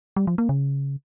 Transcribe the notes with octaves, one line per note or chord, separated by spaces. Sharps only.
G3
F3
A#3
C#3